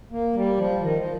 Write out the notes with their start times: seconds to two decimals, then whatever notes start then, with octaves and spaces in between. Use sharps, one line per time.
0.11 A#3
0.35 G3
0.57 F3
0.81 D#3
0.97 F3